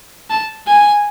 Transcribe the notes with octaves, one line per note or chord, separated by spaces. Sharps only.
A5
G#5